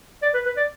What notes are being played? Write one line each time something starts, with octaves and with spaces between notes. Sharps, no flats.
D5
B4
B4
D5